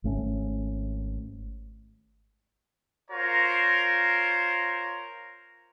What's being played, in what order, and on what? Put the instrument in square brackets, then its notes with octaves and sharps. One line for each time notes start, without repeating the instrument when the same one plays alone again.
[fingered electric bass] G#1 A3 C#4
[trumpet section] F4 A#4 C5 C#5 A#5